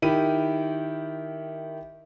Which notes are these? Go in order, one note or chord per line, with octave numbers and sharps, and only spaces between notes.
D#3 E4 G4 D#7